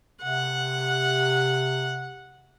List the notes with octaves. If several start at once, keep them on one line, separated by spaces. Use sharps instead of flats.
C3 F#5